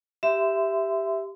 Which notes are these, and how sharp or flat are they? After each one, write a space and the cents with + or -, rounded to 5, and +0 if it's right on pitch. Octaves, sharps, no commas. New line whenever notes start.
G4 +0 E5 +5 C6 -30